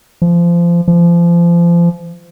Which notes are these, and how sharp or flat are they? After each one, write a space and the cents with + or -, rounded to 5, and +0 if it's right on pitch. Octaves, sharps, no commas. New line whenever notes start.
F3 -25
F3 -30